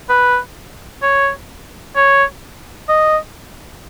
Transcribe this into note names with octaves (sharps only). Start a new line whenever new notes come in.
B4
C#5
C#5
D#5